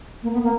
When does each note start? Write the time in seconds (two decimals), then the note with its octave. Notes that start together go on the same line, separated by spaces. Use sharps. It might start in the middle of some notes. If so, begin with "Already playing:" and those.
0.23 A#3
0.33 B3
0.43 A#3